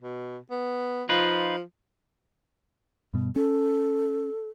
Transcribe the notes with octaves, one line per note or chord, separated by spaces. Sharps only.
B2
B3
F3 D#4 F4 B4
G2 B2
C#4 A4